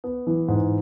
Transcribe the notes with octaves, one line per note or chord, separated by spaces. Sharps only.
B3
E3
G#2